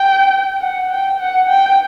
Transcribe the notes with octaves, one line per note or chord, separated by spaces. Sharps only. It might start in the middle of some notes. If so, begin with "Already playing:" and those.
Already playing: G5
F#5
G5
F#5
G5